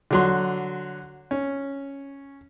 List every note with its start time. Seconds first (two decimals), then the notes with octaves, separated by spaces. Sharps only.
0.11 D3 F#3 C6
1.31 C#4